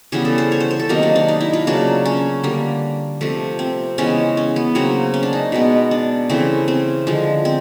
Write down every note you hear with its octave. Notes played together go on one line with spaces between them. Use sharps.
C#3 E3 G3 B3 G#4
A4
C5
C#5
C5
C5
A4
C3 D#3 F#3 A#3 D#4
D4
D4
D#4
E4
F4
C#3 F#3 A#3 D4
C#4
D3 G3 A#3
C3 F3 A3
C4
C#3 E3 G#3 B3 C#4
C#4
B3
C#3 F#3 A#3 C4
C#4
D4
D#4
B2 G#3 B3
D4
C#3 E3 A3 C4
C4
D3 F3 G#3
C4